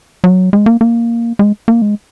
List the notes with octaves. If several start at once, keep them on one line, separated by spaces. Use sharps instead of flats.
F#3
G#3
A#3
A#3
G#3
A#3
G#3